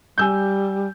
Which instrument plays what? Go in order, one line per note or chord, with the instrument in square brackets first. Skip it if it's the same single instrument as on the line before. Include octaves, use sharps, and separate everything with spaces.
[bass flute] G3 [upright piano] G#5 E6 G6